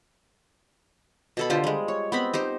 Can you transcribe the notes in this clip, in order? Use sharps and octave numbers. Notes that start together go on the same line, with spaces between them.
B2 A4 B5
D3 F4 G4 C5
G3 G#3
C#5
B3 C4 B5
D#4 G4 C5